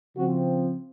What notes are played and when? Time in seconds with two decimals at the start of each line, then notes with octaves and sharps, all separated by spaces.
0.16 C#3 F3 C4 F#4